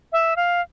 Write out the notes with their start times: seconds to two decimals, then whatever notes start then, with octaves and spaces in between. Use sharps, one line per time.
0.12 E5
0.36 F5